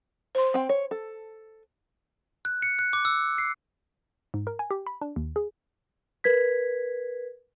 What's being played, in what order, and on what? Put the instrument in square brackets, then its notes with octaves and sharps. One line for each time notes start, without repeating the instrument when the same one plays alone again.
[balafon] C5 C6
[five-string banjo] C4 G5
C#5
A4
[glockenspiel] F#6
C#7
F#6
D6
E6
C7
[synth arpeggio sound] G#2
A#4
G#5
G4
B5
D4
D#2
G#4
[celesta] A#4 B4 G#6 B6